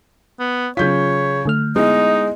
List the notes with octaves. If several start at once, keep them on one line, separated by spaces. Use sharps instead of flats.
B3
C#3 F#3 F4 C#5 G6 B6
D3 A3 F6
G#3 B3 D#4 E4 D#5